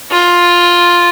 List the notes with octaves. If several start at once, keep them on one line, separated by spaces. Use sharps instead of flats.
F4